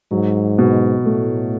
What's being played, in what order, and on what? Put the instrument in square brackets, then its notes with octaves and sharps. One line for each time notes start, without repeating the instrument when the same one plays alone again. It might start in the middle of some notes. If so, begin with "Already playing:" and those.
[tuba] G#2 [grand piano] F#3
[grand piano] B2
[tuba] A2 [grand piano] A3